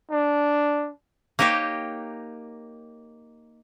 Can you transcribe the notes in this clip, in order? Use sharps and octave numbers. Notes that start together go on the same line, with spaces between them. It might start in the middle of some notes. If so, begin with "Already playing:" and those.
D4
A#3 D#4 G4 C#5 G5